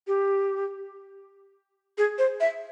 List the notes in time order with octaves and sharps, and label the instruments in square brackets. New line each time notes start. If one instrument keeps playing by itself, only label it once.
[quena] G4
G#4
C5
E5